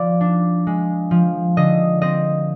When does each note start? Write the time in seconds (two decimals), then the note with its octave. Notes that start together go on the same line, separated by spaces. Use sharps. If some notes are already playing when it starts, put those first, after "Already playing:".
Already playing: F3 D5
0.21 D4
0.67 G#3
1.11 F3
1.57 D3 D#5
2.02 C4 D#5